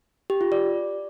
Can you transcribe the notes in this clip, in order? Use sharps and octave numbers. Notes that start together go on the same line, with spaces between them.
G4
F4
D5